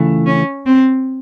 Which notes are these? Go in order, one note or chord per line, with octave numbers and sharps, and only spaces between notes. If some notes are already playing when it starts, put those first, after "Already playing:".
Already playing: C#2 C#3 E3 A3
C#4
C4